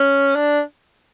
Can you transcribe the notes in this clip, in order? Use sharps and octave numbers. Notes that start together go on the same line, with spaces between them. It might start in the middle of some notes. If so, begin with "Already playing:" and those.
Already playing: C#4
D4